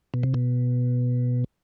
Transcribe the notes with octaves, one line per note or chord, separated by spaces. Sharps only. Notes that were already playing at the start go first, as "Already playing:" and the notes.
B2
C3
B2